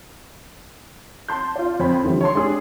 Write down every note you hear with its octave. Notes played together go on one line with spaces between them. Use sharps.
A5 C6 G6
F4 D5
F2 C5 G5 B5
D3 E3 F3 G3
C#5 A5 C6
G#3 D4 G4 G#4